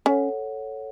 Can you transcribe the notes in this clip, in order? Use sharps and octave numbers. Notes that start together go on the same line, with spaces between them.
C#4 A4 C#5 F#5